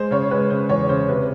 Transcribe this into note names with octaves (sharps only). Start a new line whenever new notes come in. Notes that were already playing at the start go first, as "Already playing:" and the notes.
Already playing: G#3 C5
C#3 C#5
G#3 B4
C#3 C5
E2 C#5
C#3 C5
C3 B4